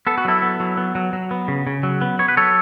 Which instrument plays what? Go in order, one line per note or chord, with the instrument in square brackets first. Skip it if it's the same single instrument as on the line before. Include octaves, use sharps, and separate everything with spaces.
[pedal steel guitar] B3 A4
F#4
F#3 E4 A4
B3
F#3
B3
F#3
F#3
B3
C#3
C#3
F#3
B3
B3 C#5
B4
F#3 A4 C#5